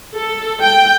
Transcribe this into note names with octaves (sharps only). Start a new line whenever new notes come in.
A4
G5